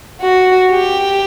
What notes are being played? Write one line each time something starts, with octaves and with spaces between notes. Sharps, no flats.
F#4
G4